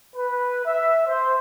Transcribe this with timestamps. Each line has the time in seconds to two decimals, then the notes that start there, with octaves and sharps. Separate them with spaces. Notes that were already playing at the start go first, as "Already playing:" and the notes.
0.15 B4
0.65 E5
1.08 C5